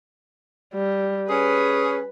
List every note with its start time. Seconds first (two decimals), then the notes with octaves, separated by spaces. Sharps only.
0.74 G3
1.29 C#4 G#4 B4